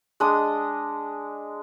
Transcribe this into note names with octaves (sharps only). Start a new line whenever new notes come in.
G#3 D4 D#5 D#6